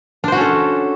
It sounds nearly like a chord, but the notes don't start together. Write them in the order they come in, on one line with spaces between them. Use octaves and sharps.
D4 C5 F#4 C#4 A4